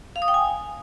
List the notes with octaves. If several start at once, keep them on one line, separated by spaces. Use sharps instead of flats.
F5
D#6
G5
G#5